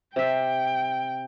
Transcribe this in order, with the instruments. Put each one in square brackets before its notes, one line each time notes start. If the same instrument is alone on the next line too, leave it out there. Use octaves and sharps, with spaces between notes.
[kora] C3 E5 [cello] G5